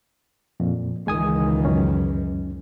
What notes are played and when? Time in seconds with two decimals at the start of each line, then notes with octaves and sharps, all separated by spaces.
0.60 F2 A#2
1.07 C#2 D#3 E3 G#3 G#5 D#6
1.65 F#2 C#4